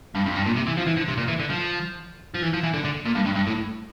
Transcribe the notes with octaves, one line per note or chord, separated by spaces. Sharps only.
G2
F2
G2
A#2
C3
E3
F3
E3
D3
C3
A#2
E3
D3
F3
F3
E3
F3
E3
D3
D3
A#2
G2
G2
G2
A2